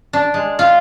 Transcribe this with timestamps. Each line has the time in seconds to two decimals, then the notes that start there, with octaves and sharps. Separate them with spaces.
0.13 D4
0.34 G#3
0.59 F4